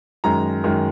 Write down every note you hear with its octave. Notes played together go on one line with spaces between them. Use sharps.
F#2 D#3 G#3 A#5
F#2 D#3 G#3